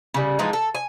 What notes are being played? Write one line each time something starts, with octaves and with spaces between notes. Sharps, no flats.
C#3 G3
E3 F3 G#3 D#4
A4
G#5